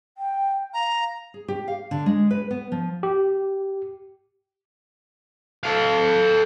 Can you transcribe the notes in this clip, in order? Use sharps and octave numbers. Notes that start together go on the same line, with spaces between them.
G5
F5 A#5
G#4
G4
F5
D3
G#3
B4
B3
F3
G4
A4 F5